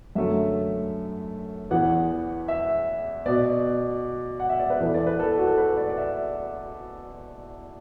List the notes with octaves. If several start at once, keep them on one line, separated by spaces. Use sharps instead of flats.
F#2 D3 F#3 A3 E5
E2 E3 B3 F#5
E5
B2 B3 D5
F#5
E5
D5
B4
E2 E3 B3 A4
D5
B4
A4
F#4
A4
B4
D5
D5
E5